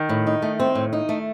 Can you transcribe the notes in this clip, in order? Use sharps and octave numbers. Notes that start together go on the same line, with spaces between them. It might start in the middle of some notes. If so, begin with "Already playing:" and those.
Already playing: D#3
A2
D#4
A3
C4
A2
D#4
A3